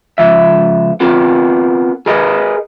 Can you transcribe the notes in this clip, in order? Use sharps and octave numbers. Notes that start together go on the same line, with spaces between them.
C#2 F3 E5
B3 C4 F4 A#4
G#4 A#4 B4 D#5